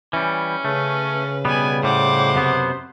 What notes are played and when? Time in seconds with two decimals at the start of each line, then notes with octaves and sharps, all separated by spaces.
0.13 E3 G3 C#4
0.65 C#3 A3 B4
1.45 B2 G3 B3 B4 G#5
1.83 A2 G3 C5 F#5 D6
2.35 F#2 C3 B3